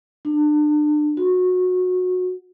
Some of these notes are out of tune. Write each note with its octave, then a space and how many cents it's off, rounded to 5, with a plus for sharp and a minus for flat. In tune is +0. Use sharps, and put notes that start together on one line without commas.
D4 +35
F#4 -20